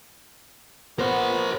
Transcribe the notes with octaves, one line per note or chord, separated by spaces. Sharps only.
B3 A#4 C5